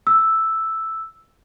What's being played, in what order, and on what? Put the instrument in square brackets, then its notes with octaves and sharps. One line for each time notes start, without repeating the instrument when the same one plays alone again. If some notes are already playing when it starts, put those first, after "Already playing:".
[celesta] E6